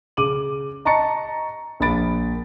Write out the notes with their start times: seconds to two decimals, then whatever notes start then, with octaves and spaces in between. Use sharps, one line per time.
0.17 C#3 D6 D#7 F#7
0.85 D#5 A5 A#5 C#6 A6 C#7
1.80 A#1 A#3 B5 A6 D7